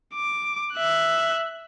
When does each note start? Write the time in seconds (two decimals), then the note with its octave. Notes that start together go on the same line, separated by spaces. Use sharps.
0.15 D6
0.73 E5 F#6